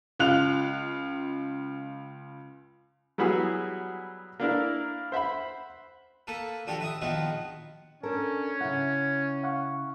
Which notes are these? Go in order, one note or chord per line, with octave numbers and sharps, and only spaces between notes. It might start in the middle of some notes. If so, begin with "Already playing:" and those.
C#2 F4 F#6 F7
F#3 G3 B3 E4 F#4 G#4
A#3 D4 E4 A#4
C5 E5 F#5 B5
A#3 A4 B4
F3 D4 F#4 G4 A4
B4 E5 D#6
A#1 D#3 F3 B3 F4 F#4
C#4 D4 A4 A#4
C#3 E4 F#5
F5 F#5 C#6